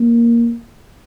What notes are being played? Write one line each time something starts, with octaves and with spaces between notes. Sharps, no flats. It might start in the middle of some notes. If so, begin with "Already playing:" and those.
Already playing: A#3